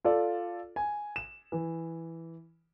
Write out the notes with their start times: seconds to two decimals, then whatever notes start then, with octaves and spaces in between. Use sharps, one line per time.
0.05 F4 A4 D5
0.76 G#5
1.16 E7
1.52 E3